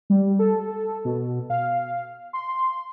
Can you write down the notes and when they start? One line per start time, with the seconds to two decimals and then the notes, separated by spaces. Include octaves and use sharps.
0.10 G3
0.39 A4
1.05 B2
1.50 F5
2.33 C6